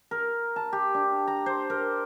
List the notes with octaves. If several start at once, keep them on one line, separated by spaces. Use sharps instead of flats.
A#4
A5
G4
D4
A#5
C5
A#4